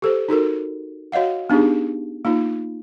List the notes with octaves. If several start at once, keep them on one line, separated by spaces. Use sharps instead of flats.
G4 A4 C5
D#4 F#4 A4 A#4
F#4 C#5 D#5 F5 F#5
B3 D4 D#4 G4 G#4
A#3 D#4 F4